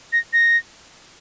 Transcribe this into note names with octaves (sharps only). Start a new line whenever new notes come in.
A#6
A#6